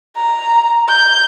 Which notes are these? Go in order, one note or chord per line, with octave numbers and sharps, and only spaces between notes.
A#5
G6